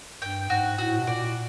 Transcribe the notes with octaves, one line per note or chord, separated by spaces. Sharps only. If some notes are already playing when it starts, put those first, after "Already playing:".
G2 G5
G#2 F#4
A2 F#4
B2
A#2 D5